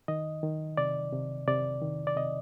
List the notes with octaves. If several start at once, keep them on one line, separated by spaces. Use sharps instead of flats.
D#3 D#5
D#3
C3 D5
C3
C3 D5
D#3
D5
C3 D#5